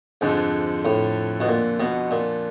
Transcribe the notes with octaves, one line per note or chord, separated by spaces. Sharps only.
F2 G#2 D3 F3
A2
B2
A#2
B2
A#2